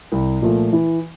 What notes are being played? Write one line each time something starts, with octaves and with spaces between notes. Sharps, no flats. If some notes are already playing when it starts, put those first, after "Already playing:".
C2
A#2 F3 A3
E3